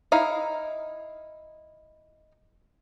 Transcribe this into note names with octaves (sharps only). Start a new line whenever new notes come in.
D#4 E4 F5